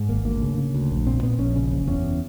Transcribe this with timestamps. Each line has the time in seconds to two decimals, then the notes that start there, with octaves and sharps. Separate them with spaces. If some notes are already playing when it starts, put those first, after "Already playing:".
Already playing: G#2
0.09 G#1 A#3
0.25 D2 A#3
0.42 C#3
0.58 C#3
0.74 D2
0.90 A#1
1.07 A#2 C4
1.23 A#2 B3
1.39 A#1 C#4
1.56 C#3
1.71 F#1
1.88 E2 C#4